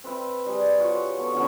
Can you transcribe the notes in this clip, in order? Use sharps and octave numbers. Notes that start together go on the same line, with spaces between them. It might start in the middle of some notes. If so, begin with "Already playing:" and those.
C4 B4 E5 G5
G3 G#4
F4 F#4 C#5
B3 A4 C#5
D3 F3 B3 C#4